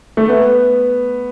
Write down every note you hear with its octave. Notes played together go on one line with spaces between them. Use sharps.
A3
B3